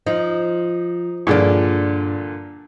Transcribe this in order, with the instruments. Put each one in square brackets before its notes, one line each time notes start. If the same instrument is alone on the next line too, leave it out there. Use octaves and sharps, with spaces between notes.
[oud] F3 [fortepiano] D#4
[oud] G2 G#4 D5 [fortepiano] A#2 D3 F3